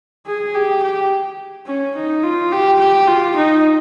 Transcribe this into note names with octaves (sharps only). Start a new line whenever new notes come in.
G#4
G4
G4
C#4
D#4
F4
G4
G4
F4
D#4